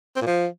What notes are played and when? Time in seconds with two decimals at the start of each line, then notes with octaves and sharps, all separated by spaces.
0.16 C4
0.22 A#2
0.27 F3